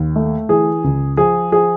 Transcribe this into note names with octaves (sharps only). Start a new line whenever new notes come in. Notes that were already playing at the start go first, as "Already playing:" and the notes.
Already playing: D#2
A3
E3 G#4
C#2
F3 G#4
F3 G#4